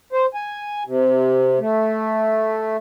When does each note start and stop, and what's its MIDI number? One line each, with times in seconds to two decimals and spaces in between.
0.13 0.26 72
0.34 0.83 80
0.87 1.59 48
1.59 2.77 57